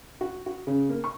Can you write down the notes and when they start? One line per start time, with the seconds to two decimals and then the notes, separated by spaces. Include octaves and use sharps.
0.21 F#4
0.46 F#4
0.67 C#3
0.89 A#3
1.04 C#6